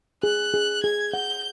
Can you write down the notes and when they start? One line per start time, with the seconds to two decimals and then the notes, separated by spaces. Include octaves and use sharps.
0.23 G#4 F#6
0.54 G#4
0.83 G#4 G#6
1.13 F#5 G6